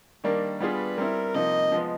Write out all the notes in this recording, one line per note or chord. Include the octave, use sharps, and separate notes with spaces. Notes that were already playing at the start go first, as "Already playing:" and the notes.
D#3 G3 A#3 D4
G3 B3 D4 F4 G#4 B4
G3 C4 E4 A#4
C3 F3 A#3 D#4 D#5
F3 G#3 B3